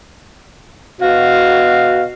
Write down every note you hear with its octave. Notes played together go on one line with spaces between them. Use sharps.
B2 F#4 F5